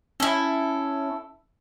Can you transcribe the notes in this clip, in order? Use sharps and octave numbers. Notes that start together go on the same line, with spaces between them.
C#4 E4 A4